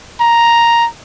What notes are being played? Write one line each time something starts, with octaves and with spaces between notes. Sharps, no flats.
A#5